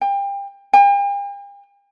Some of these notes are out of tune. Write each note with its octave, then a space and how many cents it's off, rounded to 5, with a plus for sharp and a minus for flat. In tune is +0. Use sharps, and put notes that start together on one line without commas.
G5 +30
G5 +45